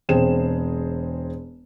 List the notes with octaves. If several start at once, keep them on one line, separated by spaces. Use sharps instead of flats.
E1 C4 G#4 E7